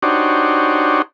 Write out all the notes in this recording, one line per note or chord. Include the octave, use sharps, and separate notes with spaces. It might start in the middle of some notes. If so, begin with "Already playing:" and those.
D4 D#4 F#4 G4 C5 C#5